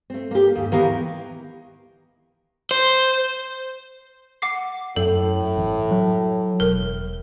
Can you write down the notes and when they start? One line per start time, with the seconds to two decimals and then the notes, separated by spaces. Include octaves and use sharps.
0.10 A3 C4
0.31 A#3 G4
0.55 D#2 G#2
0.72 D#3 E3 B3 G4 A#4 F5
2.71 C5
4.42 F#5 D6 C7
4.96 F#2 A2 A4
5.57 A1
5.91 F#3
6.60 E1 A#4